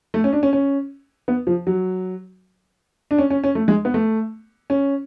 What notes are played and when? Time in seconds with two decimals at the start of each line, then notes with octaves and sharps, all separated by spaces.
0.14 A3
0.24 C#4
0.33 D4
0.43 C#4
0.53 C#4
1.28 B3
1.47 F3
1.67 F#3
3.11 D4
3.18 C#4
3.30 C#4
3.44 C#4
3.55 A3
3.68 G#3
3.85 B3
3.94 A3
4.70 C#4